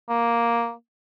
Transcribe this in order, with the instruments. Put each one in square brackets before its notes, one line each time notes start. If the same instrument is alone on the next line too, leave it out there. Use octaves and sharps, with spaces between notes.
[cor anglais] A#3